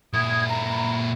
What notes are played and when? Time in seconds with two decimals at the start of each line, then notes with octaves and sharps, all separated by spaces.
0.14 A#2 E4 D#6 G#6
0.49 A#5 B5